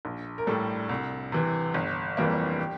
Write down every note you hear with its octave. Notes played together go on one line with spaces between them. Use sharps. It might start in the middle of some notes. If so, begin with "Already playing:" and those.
A#1
A#4
A2 G3 A4
C2
C3 E3
G1
F2 E3 G3 A#3
G4